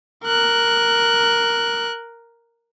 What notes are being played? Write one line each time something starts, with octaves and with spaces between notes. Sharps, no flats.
A#4 F#6